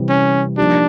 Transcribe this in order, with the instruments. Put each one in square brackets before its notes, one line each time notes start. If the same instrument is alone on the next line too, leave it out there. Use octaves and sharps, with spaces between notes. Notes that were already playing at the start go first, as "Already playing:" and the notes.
Already playing: [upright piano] C3 E3 G3 C4
[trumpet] C#4
[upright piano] F3 A#3 D#4 G4 [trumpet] D4